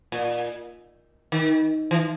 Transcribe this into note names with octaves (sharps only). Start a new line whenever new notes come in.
A#2
D#3
E3